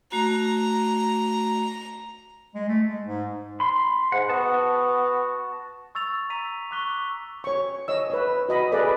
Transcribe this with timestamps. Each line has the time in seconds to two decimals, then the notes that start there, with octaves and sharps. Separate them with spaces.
0.12 A3 F#4 A#5
2.55 G#3
2.68 A3
2.88 G#3
3.05 G#2
3.60 B5 C6
4.12 G#2 F#5
4.29 B3 F#4 A5
5.95 C#6 E6 A6 F7
6.30 A#5 E6 B6 D#7 F7
6.71 C#6 D6 F#6 B6 G7
7.44 C#5 C#6
7.88 C#5 D#5 E6
8.10 B4 C#5
8.49 F#4 D#5 B5
8.72 G#4 A4 B4 D5 D#5